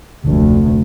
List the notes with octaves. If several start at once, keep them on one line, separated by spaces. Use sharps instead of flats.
F1 D2